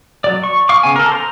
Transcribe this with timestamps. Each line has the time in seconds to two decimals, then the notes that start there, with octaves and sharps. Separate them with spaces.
0.24 F#3 D5
0.44 C#6
0.69 F5 C#6 D6
0.83 C#3 B3 G#5
0.96 A4 A#4
1.12 C5 A#5